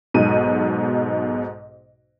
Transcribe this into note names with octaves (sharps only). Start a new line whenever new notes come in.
B1 G#2 B2 D#7